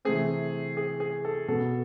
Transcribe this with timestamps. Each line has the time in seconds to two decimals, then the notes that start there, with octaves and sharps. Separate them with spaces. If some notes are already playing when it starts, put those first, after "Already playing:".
0.05 C3 E3 A3 C4 G#4
0.77 G#4
1.00 G#4
1.25 A4
1.48 B2 B3 A4